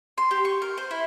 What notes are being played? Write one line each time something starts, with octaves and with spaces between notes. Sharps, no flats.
C6
G4
C#6
A#4
C5
E4